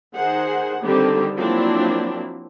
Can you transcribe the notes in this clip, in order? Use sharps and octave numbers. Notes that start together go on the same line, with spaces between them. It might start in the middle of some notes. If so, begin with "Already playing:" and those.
D#3 G#4 C5 F#5
D3 D#3 G3 C4 G4 A4
F3 F#3 A#3 C4 D4 E4